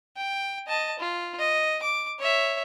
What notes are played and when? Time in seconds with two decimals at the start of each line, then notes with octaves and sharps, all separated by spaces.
0.17 G5
0.68 D#5 A5
0.99 F4
1.39 D#5
1.83 D6
2.19 C#5 E5